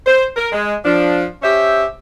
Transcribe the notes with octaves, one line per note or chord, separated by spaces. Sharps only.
C5
A#4
G#3
F3 D4
C#4 G4 C5 E5